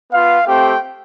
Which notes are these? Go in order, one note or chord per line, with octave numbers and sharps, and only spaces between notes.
B3 F4 F5
A3 C4 G4 G5